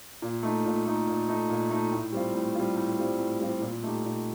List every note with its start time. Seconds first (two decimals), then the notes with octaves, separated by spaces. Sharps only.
0.22 A#2
0.43 A3 D#4
0.65 A#2
0.85 A3 D#4
1.07 A#2
1.28 A3 D#4
1.50 A#2
1.71 A3 D#4
1.92 A2
2.12 G3 C4 F4
2.34 A2
2.55 G3 C4 F4
2.77 A2
2.98 G3 C4 F4
3.19 A2
3.40 G3 C4 F4
3.61 A#2
3.83 A3 D#4 G4
4.04 A#2